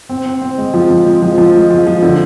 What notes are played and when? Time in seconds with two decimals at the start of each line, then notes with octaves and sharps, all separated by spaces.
0.09 C4
0.26 C4
0.42 C4
0.58 G#3
0.74 F3
0.90 F3
1.06 G#3
1.22 F3
1.38 F3
1.55 G#3
1.71 F3
1.87 F3
2.03 D3